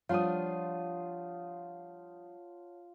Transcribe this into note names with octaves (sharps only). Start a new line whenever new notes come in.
F3 G3 D4 F4 C#5 F#5 A5 D#6